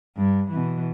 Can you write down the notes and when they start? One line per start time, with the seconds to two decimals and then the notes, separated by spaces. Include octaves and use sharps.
0.17 G2
0.50 B2 E3